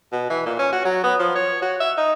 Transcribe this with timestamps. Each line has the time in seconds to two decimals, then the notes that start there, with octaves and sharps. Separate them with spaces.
0.12 B2
0.30 E3
0.46 A#2
0.59 C#4
0.72 F#4
0.85 F#3
1.04 B3
1.19 F3
1.35 C#5
1.62 F#4
1.80 E5
1.97 D#4